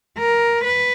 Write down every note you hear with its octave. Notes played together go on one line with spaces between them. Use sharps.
A#4
B4